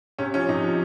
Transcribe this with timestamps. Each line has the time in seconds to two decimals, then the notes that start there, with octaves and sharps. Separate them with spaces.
0.19 C3 C#4
0.34 F3 C#4
0.49 C3 D#4
0.64 F3